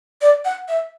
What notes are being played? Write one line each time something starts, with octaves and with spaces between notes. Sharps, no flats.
D5
F#5
E5